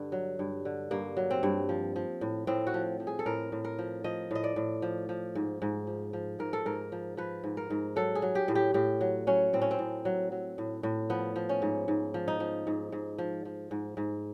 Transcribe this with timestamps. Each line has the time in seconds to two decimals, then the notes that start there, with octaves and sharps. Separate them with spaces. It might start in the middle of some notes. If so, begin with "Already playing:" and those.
Already playing: G2 D3
0.12 F#3
0.39 G2
0.65 D3
0.91 G2 A#3
1.17 F#3
1.31 C4
1.43 G2
1.69 F3
1.96 F3
2.21 A2
2.47 A2 C4
2.67 F#4
2.74 F3
3.00 F3
3.07 G#4
3.19 A4
3.26 A2 A#4
3.52 A2
3.65 A#4
3.79 F3
4.04 F3 D#5
4.31 A2 D#5
4.44 D5
4.56 A2
4.82 F3
5.09 F3
5.35 G#2
5.62 G#2
5.87 F3
6.13 F3
6.39 G#2 A#4
6.53 A4
6.65 G#2 A#4
6.92 F3
7.17 F3 B4
7.44 G#2
7.57 A#4
7.70 G#2
7.96 F#3 A4
8.15 G#4
8.22 F#3
8.35 G4
8.48 A2
8.55 G4
8.74 A2 G4
9.01 F#3
9.27 F#3 C#4
9.53 A2 C4
9.62 C#4
9.71 C4
9.79 A2
10.05 F#3
10.32 F#3
10.58 A2
10.83 A2
11.10 F3 B3
11.36 F3
11.49 C#4
11.62 G#2
11.88 G#2
12.14 F3
12.28 D#4
12.40 F3
12.67 G#2
12.92 G#2
13.18 F3
13.45 F3
13.71 G#2
13.97 G#2